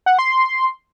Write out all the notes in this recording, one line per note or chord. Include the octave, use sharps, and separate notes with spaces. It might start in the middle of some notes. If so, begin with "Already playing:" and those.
F#5
C6